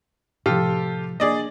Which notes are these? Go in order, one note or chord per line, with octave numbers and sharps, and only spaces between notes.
A2 C3 F3 F4 G4 A4
A#3 D4 G#4 D5 D#5